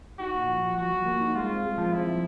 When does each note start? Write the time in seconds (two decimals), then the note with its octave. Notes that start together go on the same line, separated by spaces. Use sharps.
0.19 D#4 F#4
0.34 A#2
0.48 F3
0.63 F3
0.77 F3 F#4
0.92 F3
1.06 A#3
1.21 D#4
1.35 G#3 F4
1.49 C4
1.64 G#3
1.78 F3
1.92 C4 E4
2.07 F3